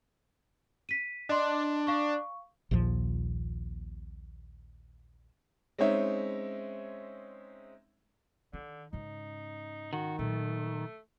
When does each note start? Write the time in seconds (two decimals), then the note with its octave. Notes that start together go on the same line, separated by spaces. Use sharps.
0.89 B6 D#7
1.29 D4 D#5 C6
1.87 F5 C#6
2.71 A#1 D#2 A#2 F3
5.78 G#3 C4 C#4 D#4 C#5 E5
8.53 D3 D#3
8.93 G#2 C#3 D#4
9.93 D#3 F#4
10.19 A#2 F#3 A3